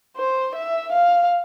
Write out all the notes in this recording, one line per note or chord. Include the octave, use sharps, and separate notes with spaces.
C5
E5
F5